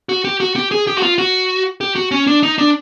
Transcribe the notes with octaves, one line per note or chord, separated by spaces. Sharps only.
F#4
G4
F#4
G4
G#4
G4
F#4
F4
F#4
G4
F#4
C#4
D4
D#4
D4